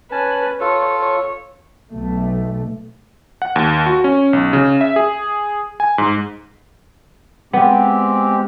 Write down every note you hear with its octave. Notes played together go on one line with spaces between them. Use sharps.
C#4 B4 G#5 A5
F4 A4 C#5
C#5
B1 A3
F#5
D#2
F#4
C#4
B1
C#3
E5
G#4
G#5
G#2
G#3 B3 C4 G4